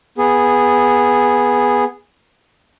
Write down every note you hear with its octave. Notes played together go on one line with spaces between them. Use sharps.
B3 G#4